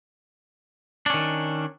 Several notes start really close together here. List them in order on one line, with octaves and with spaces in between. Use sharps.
D4 C#4 D#3